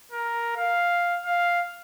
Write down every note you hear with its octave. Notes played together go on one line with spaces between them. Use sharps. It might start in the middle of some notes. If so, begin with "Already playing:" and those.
A#4
F5
F5